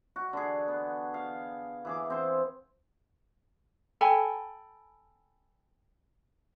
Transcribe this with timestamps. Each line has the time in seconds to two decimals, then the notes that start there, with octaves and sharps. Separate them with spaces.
0.16 F#4
0.33 D3 G#4
0.68 B3
1.14 F5
1.85 E3 G#4 D6
2.10 C4 C5
4.01 A4 G5 G#5 B5